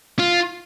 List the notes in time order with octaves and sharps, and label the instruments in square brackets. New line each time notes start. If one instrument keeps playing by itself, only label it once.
[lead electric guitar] F4